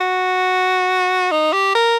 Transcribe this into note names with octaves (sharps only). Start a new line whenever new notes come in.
F#4
D#4
G4
A#4